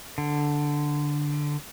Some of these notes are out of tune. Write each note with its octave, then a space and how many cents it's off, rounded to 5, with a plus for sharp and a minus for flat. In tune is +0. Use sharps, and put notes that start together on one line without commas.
D3 +0